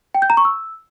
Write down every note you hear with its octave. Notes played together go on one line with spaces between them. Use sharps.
G5
G6
A#5
C#6
E6